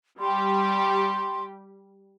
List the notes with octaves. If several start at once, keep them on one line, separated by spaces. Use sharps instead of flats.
G3 G4 C6